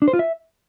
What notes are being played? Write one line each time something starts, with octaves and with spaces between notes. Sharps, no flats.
D4
C5
F4
E5